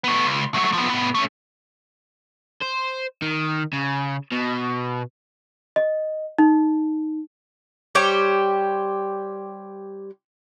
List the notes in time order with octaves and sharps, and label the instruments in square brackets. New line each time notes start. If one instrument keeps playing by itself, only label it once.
[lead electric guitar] A3 B3
C#2
F#3 A3
F3 B3
A2 B3
A3 C#4
[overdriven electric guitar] C5
D#3
C#3
B2
[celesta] D#5
D#4
[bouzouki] G3 G4 C5 C#5